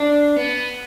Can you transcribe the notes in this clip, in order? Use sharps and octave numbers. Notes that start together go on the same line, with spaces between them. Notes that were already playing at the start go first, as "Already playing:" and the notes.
Already playing: D4
B3